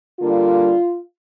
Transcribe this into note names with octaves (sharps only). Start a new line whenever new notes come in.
D3 G3 A#3 D4 F4